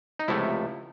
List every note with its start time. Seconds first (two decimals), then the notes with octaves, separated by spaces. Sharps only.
0.19 D#4
0.28 C#2 C3 F3 A3 E4